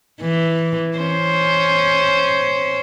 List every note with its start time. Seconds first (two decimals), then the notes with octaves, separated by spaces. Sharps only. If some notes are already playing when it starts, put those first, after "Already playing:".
0.21 E3
0.98 C#4 C5